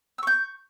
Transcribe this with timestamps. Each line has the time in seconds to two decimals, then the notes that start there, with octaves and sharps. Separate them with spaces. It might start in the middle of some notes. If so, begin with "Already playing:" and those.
0.18 E6
0.23 C#6
0.27 G6